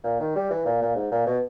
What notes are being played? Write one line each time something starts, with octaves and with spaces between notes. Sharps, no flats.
A#2
D#3
G3
E3
A#2
A#2
G#2
A#2
B2